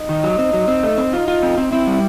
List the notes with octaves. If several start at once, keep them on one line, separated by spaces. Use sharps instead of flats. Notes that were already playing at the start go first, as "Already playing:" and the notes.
Already playing: D#4
D#3
F#3
C4
F#3
C4
A3
C4
D#4 F4
F4
C4
C4
C4 E4
G3